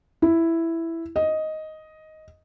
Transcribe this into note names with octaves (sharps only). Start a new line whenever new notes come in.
E4
D#5